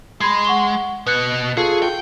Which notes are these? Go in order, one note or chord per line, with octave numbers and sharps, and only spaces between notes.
G#3 B5 G#6 C7
F#5 C#6 G7
B2 B4 F#6 C#7
F4 G#4 A4 C#6
G5